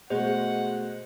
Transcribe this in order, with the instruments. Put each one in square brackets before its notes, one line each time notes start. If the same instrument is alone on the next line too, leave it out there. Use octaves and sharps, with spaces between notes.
[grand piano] B2 A3 [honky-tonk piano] G#3 [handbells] C5 [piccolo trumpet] F#5